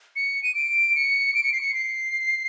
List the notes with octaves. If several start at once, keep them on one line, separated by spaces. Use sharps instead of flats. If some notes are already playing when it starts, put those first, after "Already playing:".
C#7
D#7
D7
C#7
D7
C#7
C7
C#7
C7